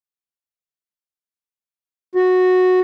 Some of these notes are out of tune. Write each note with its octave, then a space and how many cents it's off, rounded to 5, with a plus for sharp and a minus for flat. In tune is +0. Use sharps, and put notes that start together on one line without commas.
F#4 -10